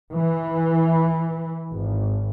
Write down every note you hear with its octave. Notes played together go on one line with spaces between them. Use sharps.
E3
G#1